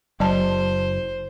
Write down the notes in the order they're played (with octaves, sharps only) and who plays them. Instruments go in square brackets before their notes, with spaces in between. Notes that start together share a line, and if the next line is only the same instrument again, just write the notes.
[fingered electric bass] F#1 [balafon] F#3 D5 A5 [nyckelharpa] C5